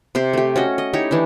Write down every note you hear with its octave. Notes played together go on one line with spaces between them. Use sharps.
C3 G4 C5
A3 G4
C#4 F#4 D#5
D#5
D#4 E4 G4 C#5
E3 D4 E4